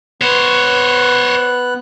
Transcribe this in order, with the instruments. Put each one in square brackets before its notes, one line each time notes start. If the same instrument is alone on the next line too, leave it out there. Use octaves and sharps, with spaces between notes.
[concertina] B3 F#6 [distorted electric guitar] C5 C#5